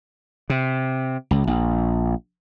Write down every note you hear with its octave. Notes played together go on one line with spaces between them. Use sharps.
C3
C#2
A#1